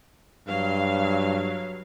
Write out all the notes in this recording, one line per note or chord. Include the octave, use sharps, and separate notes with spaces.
G2 F#3 F5